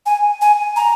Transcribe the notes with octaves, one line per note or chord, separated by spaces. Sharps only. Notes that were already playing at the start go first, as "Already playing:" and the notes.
G#5
G#5
A#5